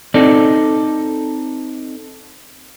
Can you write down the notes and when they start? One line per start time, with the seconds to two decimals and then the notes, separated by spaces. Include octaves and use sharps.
0.14 C4 D#4 A4 D5